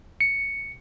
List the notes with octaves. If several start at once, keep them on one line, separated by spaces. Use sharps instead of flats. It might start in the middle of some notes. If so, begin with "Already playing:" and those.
C#7